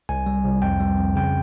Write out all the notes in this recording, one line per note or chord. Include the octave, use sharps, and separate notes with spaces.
C2 G#5
G3
C2
F2 G5
G3
F2
C#3 G5